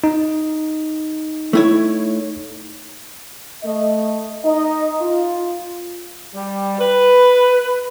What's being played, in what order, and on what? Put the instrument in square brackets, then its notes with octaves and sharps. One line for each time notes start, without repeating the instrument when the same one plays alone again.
[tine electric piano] D#4
[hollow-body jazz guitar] A3 E4 C#5
[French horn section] A3 D#5
D#4 D#5
F4
[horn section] G3
B4